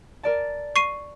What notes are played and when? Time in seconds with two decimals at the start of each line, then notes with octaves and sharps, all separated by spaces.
0.23 A#4 D5 A5
0.76 C#6 C7 D#7